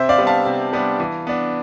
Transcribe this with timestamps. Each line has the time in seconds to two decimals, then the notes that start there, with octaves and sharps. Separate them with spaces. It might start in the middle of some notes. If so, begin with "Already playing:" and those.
Already playing: C3 C5 E5
0.09 D5 F5
0.18 G3 B3 D4
0.27 F5 A5
0.45 C3
0.73 G3 B3 D4
1.00 E3
1.27 B3 D4